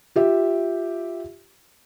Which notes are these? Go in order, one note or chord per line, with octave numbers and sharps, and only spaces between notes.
F4 G4 E5